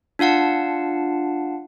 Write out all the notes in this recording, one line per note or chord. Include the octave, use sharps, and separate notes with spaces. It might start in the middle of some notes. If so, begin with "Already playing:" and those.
D4 F4 F5 F#5 A5